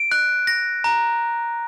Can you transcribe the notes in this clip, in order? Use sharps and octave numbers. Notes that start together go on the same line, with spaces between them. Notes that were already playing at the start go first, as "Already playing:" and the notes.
Already playing: D7
F#6
A#6
A#5